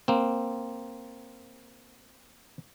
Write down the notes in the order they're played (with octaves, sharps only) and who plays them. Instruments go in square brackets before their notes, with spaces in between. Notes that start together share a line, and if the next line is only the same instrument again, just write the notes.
[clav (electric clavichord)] A#3 C4